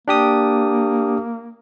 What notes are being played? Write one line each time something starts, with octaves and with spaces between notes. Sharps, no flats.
A#3 D4 G4 D#6